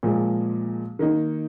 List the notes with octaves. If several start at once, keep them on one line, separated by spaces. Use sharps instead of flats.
A#2 F3 G#3
D#3 A#3 D#4